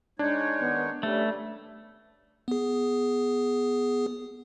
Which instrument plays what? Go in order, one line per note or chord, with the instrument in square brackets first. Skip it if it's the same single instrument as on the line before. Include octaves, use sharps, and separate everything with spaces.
[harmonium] G#3 D#4 C#5 [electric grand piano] D4
[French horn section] D#3 B3
[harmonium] G3 [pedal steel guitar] A3 [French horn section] C#4 G4 B4
[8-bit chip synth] B3 G#4